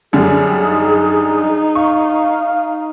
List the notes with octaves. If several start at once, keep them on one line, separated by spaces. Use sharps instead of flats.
F#2 D3 G3 G#4
D#4
F5 C#6